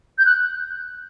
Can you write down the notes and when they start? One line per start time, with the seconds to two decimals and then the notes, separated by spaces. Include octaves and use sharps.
0.18 G6
0.26 F#6